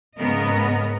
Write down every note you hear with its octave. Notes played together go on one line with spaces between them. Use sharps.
G#2 C#3 B3 A#4 D#5